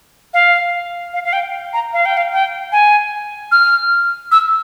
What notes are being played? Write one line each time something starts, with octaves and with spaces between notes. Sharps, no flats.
F5
F5
F5
G5
A#5
F5
G5
F5
G5
G#5
F6
E6